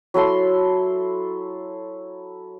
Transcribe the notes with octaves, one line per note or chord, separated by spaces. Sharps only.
F#3 E4 A4 C6